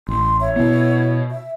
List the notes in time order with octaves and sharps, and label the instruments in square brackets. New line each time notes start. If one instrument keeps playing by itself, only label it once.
[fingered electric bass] A1 [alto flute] C6
[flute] C#5 [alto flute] E5
[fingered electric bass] B2 B3 [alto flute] E4
[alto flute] E5